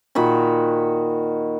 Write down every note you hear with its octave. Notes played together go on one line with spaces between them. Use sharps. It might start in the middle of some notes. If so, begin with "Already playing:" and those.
A#2 D#3 F#4 B5